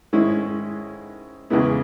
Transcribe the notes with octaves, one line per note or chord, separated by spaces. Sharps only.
G#2 D#3 G#3 C#4 E4
E2 C#3 G#3 B3 E4